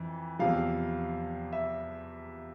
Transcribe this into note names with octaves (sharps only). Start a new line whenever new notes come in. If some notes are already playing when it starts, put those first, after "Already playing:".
Already playing: F2 E3
E2 C3 F3 F5
E5